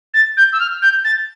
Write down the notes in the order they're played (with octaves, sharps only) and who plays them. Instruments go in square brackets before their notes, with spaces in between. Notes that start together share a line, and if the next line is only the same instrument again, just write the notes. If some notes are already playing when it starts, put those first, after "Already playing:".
[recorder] A6
G6
E6
F6
G6
A6